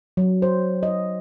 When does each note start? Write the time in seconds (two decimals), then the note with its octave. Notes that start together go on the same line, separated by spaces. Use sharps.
0.17 F#3
0.42 C5
0.83 D#5